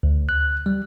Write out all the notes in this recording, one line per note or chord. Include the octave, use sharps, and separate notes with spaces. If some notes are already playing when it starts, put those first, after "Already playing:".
D2
F#6
G3